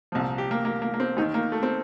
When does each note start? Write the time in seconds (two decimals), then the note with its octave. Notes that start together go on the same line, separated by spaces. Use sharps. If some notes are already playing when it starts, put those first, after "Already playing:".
0.12 C2 A#2 F3
0.38 G4
0.51 A#3
0.65 A#3
0.82 A#3
0.94 A#3
1.00 C4
1.17 D#2 D#4
1.21 D#3
1.34 A#3
1.52 A3
1.63 C4